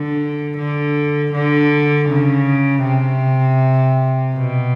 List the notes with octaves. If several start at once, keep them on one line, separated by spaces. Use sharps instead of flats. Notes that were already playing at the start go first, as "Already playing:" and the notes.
Already playing: D3
D3
D3
C#3
C3
B2